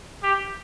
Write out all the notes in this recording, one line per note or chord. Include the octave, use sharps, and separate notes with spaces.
G4